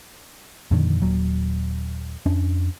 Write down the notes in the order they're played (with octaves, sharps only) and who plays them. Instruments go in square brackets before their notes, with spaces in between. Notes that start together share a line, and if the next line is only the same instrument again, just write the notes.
[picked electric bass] F2 A#2 D3 D#3
D#1 A#2 F#3
F2 C#4 D4